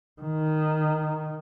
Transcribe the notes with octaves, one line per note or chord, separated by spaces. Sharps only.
D#3